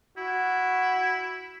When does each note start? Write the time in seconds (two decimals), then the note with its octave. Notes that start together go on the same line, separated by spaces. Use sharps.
0.17 E4 F#4